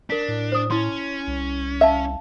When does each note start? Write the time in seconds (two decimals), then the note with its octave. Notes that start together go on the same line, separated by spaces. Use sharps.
0.10 D4 A#4 B6
0.28 A2
0.52 C5 D#6
0.71 C#4 E4 C6
1.27 C2
1.81 E5 F5 A5